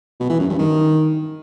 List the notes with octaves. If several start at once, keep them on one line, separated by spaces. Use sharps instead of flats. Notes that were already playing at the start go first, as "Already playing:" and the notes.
B2
E3
F#2
G2
D#3